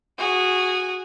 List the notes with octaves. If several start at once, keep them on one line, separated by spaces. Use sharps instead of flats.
F#4 G#4